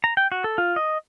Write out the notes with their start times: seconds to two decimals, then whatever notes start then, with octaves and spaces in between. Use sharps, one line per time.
0.04 A#5
0.17 G5
0.32 F#4
0.44 A4
0.58 F4
0.76 D#5